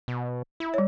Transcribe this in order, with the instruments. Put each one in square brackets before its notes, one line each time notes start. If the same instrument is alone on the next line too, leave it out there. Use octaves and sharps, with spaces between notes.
[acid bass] B2
E4
[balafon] G3 C#5